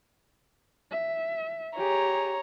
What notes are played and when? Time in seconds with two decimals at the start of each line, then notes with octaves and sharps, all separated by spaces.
0.91 E5
1.77 G4 G#4 C#5 A#5